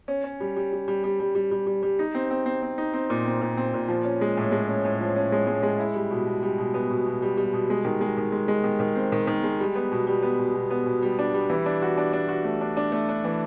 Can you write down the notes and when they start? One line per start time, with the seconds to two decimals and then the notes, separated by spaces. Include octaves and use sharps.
0.08 C#4
0.24 C#4
0.40 G3
0.56 G3
0.72 G3
0.88 G3
1.04 G3
1.20 G3
1.35 G3
1.51 G3
1.66 G3
1.83 G3
1.99 D#4
2.15 C4
2.31 C4
2.46 C4
2.62 C4
2.78 D#4
2.93 C4
3.10 A#2
3.26 C4
3.41 A#2
3.57 C4
3.74 A#2
3.88 F3
4.04 C#4
4.21 G#3
4.37 A2
4.52 G#3
4.68 C#4
4.85 A2
5.01 F3
5.16 C#4
5.32 G#3
5.47 G#3
5.63 G#3
5.79 E4
5.95 G3
6.11 B2
6.26 B2
6.43 G3
6.58 B2
6.74 B3
6.90 B2
7.07 B2
7.22 G3
7.37 G3
7.53 B2
7.70 G#3
7.85 D#3
8.01 G#3
8.17 D#3
8.32 G#3
8.48 G#3
8.64 D#3
8.80 D#3
8.96 C4
9.12 D#3
9.27 D#3
9.43 G#3
9.60 G3
9.75 B3
9.92 B2
10.07 G3
10.22 B3
10.39 B2
10.54 B2
10.70 B3
10.86 B2
11.02 G3
11.19 D4
11.34 G3
11.50 E3
11.66 D4
11.82 F#4
11.97 D4
12.13 D4
12.28 F#4
12.44 A3
12.61 D4
12.77 D4
12.92 A3
13.09 D4
13.24 E3